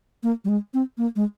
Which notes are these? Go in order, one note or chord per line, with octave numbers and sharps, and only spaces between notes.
A#3
G3
G#3
C4
A#3
G#3